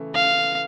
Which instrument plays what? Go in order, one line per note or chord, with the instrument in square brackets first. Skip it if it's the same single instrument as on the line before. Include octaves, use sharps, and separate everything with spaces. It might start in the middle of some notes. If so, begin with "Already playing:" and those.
Already playing: [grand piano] C#3 E3 A3
[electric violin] F5